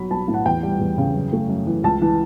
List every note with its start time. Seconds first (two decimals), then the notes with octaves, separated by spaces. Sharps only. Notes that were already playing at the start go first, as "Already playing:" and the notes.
Already playing: B1 F#3 B5
0.10 B1 A5
0.28 A2
0.34 F#5
0.45 E2 G5
0.63 G3
0.80 E2
0.98 C#3
1.15 F#2
1.33 A3
1.49 F#2
1.67 E3
1.83 C#2 A5
2.02 E3